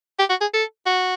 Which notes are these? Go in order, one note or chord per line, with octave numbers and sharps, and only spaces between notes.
G4
F#4
G#4
A4
F#4